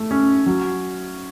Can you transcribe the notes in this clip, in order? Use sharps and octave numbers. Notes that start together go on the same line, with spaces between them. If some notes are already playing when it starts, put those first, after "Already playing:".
Already playing: A3
C#4
F#3